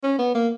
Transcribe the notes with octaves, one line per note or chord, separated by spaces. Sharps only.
C#4
B3
A#3